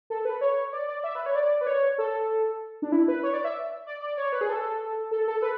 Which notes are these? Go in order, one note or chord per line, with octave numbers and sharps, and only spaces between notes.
A4
B4
C#5
D5
D5
E5
B4
C#5
D5
B4
C#5
A4
D4
E4
B4
C#5
D5
E5
D5
D5
C#5
B4
G#4
A4
A4
A4
B4